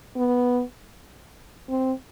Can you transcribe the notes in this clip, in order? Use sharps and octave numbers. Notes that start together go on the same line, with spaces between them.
B3
C4